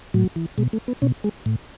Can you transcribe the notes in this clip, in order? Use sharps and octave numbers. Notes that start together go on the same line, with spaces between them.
A2 F#3
E3
B2 G#3
A3
B3
B2 C#4
G#3
A2